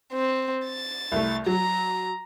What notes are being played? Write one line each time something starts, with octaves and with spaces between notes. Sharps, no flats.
C4
A6
C2 A3
F#3 A#5